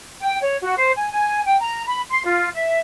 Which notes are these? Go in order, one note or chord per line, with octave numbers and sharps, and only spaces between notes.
G5
C#5
F#4
C5
G#5
G#5
G5
A#5
B5
C6
F4
E5